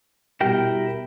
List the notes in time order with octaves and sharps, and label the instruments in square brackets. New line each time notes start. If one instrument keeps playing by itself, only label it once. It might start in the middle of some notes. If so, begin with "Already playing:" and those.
[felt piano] B2 G3 [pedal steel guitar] E4 A#4 G5